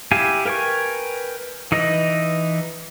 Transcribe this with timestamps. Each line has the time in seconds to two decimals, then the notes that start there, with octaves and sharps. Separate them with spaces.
0.11 E4 G4 F5 G#5
0.46 A#4 B4 G5 G#5 C#6
1.72 E3 D#4 B4 D#5